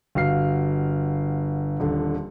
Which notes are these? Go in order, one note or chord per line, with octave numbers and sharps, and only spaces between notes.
G1 F#4 F5 F6 C7
D#1 D3